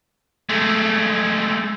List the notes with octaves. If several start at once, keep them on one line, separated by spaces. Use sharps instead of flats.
G#3 A3